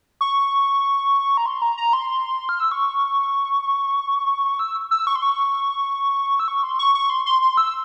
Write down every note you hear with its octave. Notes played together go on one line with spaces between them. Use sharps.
C#6
A#5
C6
A#5
A#5
C6
F6
E6
C#6
E6
E6
C#6
C6
C#6
E6
C#6
C6
C#6
C#6
C6
C6
C6
E6